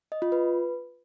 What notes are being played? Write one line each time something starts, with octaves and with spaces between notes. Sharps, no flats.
D#5
F4
B4